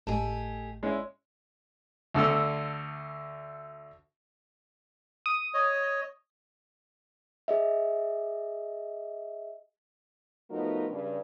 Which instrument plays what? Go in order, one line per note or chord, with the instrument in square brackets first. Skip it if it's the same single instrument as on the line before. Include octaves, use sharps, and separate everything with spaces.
[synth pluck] G#1 A2 [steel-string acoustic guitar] A3 G4 G#4 [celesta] D#5 A5
[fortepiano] G#3 C#4 E4 [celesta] C#5 D5
[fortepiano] D2 D3 A4 E6
[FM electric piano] D#6
[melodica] C#5 D#5
[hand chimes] G#4 D#5 E5
[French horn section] F3 A3 B3 D#4 F#4 A#4
G2 C#3